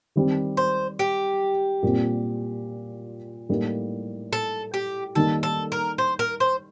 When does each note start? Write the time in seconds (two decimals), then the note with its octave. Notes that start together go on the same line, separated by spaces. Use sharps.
0.16 D#3 G3 C4
0.57 C5
0.99 G4
1.83 A#2 G3 C4
3.49 A2 G3 A#3 D#4
4.33 A4
4.74 G4
5.15 D#3 G3 A#3 D#4 A4
5.43 A4
5.72 A#4
5.98 C5
6.19 A#4
6.40 C5